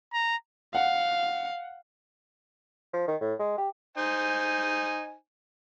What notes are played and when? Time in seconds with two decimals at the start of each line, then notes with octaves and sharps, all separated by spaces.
0.13 A#5
0.75 F5 F#5
2.93 F3
3.08 D#3
3.21 A2
3.39 G#3
3.58 G4
3.97 D#4 C5 G#5